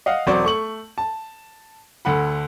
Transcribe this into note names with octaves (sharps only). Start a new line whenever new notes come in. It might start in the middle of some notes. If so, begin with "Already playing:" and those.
D#5 F5 F#5
E1 F#3 C4 C5 D5 C#6
A3 C#6 F#7
A5
D2 D3 F#5 B5